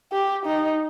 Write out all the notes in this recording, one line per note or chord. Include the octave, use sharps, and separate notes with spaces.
G4
D#4